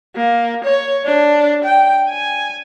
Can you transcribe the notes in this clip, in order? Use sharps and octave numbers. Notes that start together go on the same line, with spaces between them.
A#3
C#5
D4
G5
G#5